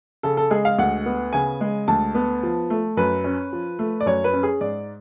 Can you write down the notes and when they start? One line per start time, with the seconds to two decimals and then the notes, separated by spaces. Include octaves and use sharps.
0.23 C#3 A4
0.37 A4
0.51 G#3 G#4
0.65 F5
0.79 D2 F#5
1.06 B3
1.33 C#3 G#5
1.61 G#3
1.88 D2 A5
2.15 B3
2.43 F3
2.70 A3
2.97 F#2 B4
3.24 C#4
3.53 F3
3.79 A3
4.01 D5
4.06 F#2 C#5
4.24 B4
4.33 C#4
4.43 G#4
4.61 G#2 D5